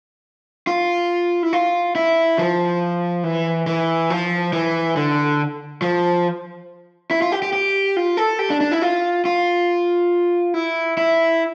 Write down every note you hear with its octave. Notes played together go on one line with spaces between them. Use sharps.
F4
E4
F4
E4
F3
E3
E3
F3
E3
D3
F3
E4
F4
G4
G4
G4
F4
A4
G4
D4
D4
E4
F4
F4
E4
E4